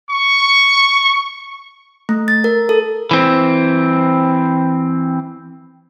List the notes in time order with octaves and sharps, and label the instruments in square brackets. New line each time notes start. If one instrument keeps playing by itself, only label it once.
[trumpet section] C#6
[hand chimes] A3
A6
A#4
A4
[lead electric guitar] E3 C4